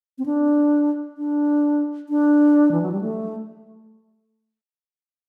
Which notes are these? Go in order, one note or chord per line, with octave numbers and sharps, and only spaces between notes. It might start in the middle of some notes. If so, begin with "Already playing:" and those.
C4
D4
D4
D4
E3
F#3
G3
A3